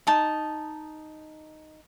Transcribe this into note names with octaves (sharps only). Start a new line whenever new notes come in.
D#4 A5 D#6